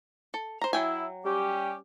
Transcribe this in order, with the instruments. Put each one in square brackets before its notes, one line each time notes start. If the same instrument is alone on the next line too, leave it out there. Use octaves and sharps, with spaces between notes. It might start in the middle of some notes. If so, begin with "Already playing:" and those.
[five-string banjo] A4
C5 A#5
[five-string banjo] F#3 G5 G#5 [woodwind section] E4
[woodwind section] G3 C#4 G4